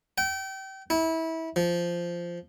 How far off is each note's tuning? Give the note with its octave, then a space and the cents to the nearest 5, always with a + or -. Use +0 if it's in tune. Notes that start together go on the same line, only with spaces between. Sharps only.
G5 -30
E4 -25
F3 -10